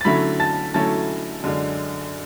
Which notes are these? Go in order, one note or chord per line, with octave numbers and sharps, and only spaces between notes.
A6
D3 F#3 A3 C#4 E4 B5 B6
A5 A6
D3 F#3 A3 C#4 E4 A5 A6
F#2 D3 G#3 D4